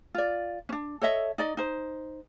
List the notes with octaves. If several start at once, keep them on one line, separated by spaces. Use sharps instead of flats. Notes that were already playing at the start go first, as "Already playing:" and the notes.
F4 D5
C#4 D4
A4 C#5 D#5 E5
D#4 D5 D#5
D#4 C5